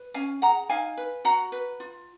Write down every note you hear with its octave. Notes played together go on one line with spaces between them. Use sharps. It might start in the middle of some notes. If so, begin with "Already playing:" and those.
Already playing: B4
C#4 F5 G#5
G#4 F#5 A#5
D#4 F5 G#5
B4
F#4 F#5 A#5
B4
F4